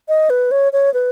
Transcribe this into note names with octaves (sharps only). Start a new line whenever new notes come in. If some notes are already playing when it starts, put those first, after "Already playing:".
D#5
B4
C#5
C#5
B4